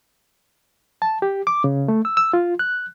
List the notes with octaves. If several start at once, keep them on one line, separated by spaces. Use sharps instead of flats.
A5
G4
D6
C#3
A3
E6
E6
F4
F#6